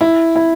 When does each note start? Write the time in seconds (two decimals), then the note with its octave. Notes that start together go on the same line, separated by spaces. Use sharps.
0.01 E4
0.36 E4